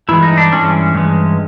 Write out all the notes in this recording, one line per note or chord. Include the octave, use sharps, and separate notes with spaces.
G2 E3 G#3 E4
D#4
D4
G2 E3 G#3 C#4
G2 E3 G#3